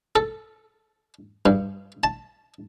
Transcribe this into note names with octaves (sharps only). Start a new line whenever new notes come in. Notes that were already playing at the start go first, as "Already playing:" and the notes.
A4
G2
A5